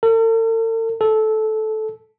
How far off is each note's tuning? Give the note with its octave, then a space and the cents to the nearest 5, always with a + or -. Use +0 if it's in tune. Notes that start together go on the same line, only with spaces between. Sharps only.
A4 +45
A4 -15